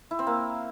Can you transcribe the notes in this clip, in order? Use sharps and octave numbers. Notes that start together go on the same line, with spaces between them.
E4
C4
A#3